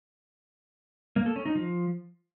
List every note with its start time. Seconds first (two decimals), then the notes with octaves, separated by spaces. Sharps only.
1.16 A#3
1.26 A4
1.36 C#4
1.46 D#4
1.55 F3